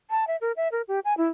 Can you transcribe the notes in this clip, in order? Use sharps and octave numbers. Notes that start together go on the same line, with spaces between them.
A5
E5
A#4
E5
A#4
G4
G#5
E4